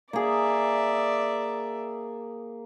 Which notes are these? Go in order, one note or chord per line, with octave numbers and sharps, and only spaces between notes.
A#3 G#4 D5 E5